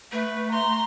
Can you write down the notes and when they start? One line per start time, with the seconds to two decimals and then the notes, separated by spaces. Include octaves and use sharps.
0.12 A3 B4
0.52 A#5 C6